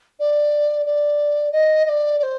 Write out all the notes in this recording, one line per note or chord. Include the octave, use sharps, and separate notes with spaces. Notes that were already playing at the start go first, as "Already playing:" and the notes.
D5
D5
D#5
D#5
D5
D5
C5